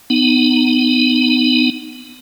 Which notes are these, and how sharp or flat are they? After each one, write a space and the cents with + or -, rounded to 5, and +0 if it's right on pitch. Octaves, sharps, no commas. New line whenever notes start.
B3 +15 D#4 -15